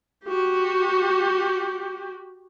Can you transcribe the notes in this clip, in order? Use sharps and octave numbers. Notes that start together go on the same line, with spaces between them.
F#4 G4